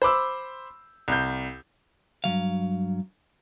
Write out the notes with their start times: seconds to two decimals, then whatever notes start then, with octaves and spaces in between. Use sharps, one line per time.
0.02 C5 B5 D6 E6
1.08 C2 G6
2.24 G2 F3 F#3 F5